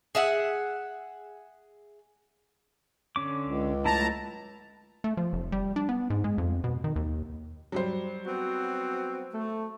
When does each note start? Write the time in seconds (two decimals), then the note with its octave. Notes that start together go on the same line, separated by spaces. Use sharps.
0.15 G#4 E5 F#5
3.16 D3 C#4 D6
3.45 C#2
3.86 F#3 A3 E4 A5 A#5
5.04 A3
5.17 F3
5.33 F1
5.52 G3
5.76 D4
5.89 B3
6.10 G#2
6.24 G#3
6.38 F2
6.64 B2
6.84 D#3
6.96 D#2
7.72 F#3 G3 C5
8.26 B3 C4 F#4
9.34 A3